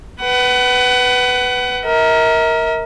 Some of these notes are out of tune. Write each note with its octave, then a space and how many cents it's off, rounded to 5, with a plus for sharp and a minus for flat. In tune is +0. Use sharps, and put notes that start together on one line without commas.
B4 +5 F#5 +30
A#4 +0 E5 -45